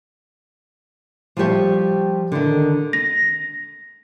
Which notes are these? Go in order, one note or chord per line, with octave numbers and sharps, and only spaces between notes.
F3 G3 F4 G4 C#5
D3 D#3
A#6